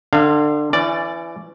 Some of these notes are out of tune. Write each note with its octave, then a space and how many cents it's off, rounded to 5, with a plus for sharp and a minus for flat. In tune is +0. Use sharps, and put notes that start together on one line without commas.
D3 +25 F5 -15
E3 +25 C#4 -10 D5 +0